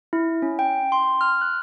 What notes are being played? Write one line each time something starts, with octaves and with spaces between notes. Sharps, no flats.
E4
C#4
G5
C6
F6
F#6